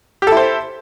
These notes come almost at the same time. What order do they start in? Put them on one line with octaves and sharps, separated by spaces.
G4 A4 E4 C5